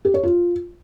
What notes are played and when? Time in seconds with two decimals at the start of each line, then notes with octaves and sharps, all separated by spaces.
0.05 G4
0.14 C#5
0.23 F4